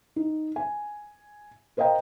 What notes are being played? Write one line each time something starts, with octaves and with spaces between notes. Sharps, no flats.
D#4
G#5
A#4 C5 D#5 F5 G5 A#5